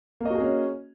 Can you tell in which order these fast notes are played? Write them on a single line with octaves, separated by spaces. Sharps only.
A#3 D#5 F#4 G#4 C#4